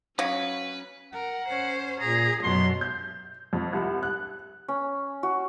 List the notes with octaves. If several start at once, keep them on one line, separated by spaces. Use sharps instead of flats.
F#3 C#4 B4 F5 G#6
A#4 F#5
C#4 C5
A#2 G#4 A#5
F#2 B2 F#3 C6
G6
F2
C2
F#6
C#4
F#4